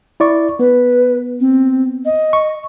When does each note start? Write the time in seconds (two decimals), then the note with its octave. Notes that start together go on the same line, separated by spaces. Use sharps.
0.20 E4 D5 C#6
0.59 B3 B4
1.40 C4
2.06 D#5
2.33 C#6